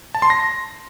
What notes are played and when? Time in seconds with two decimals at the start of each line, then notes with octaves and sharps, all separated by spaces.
0.15 A5
0.22 C6
0.30 A#6